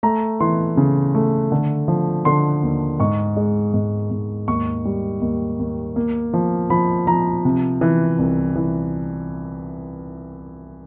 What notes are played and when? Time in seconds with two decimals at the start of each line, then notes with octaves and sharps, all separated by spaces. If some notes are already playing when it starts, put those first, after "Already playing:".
0.03 A3 A#5
0.40 E3 C6
0.77 C#3
1.15 A3
1.52 D3
1.88 F3
2.25 D3 C6
2.63 D#2
3.00 G#2 C#6
3.37 G#3
3.74 G#2
4.11 G#2
4.47 D#2 C#6
4.85 G3
5.21 D#2
5.59 D#2
5.96 A#3
6.33 F3
6.70 F3 B5
7.07 F3 A#5
7.45 C3
7.81 E3
8.19 C2
8.56 E3